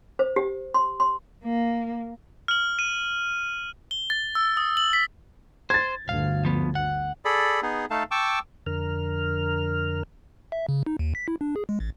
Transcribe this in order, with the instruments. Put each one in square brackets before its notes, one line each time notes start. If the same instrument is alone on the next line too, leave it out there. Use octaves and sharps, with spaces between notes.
[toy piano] C5
G4
C6
C6
[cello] A#3
[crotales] F6 F#7
D#7
G7
A6
E6
D#6
F#7
B6
[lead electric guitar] C5 [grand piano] G#6 A6
[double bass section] G1 D2 [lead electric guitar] F5
[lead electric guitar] F3 B3
F#5
[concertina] G#4 A4 D5 B5
B3 D#4 G#4
A3 D#4 A4 F5 A5
G5 A5 C#6 D6 E6
[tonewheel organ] F2 D3 A#4 F6
[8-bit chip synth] E5
C#3
D#4
D#2
B6
E4
D4
G#4
G#3
A1